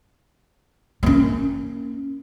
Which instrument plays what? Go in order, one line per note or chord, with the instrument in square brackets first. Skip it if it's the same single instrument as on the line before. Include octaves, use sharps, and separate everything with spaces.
[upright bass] A#3 C#4